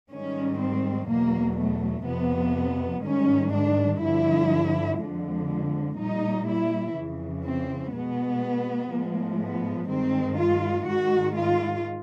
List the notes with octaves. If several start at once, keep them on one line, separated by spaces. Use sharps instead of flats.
G#2 D#3 G3 C#4
C4
E2 B2 F#3 A#3
A3
F2 C3 F3 B3
G#2 D#3 G3 C#4
D4
G2 D3 F3 E4
F2 D3 F3 G#3
A#2 G3 D#4
E4
F2 C#3 E3
C4
B2 G#3 B3
A2 F3 G#3
B3
G2 D#3 G#3 C4
F4
G#2 D#3 G#3 F#4
F4